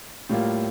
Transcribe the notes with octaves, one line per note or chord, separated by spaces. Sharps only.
A2 G3 A#3 F4